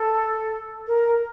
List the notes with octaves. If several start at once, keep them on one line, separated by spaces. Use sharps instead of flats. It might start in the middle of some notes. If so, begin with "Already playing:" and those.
Already playing: A4
A#4